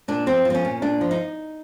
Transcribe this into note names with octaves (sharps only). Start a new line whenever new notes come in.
A#2 D4
F3 C4
F3
C4
C#4
A#2
A#2 D4
F3
D#4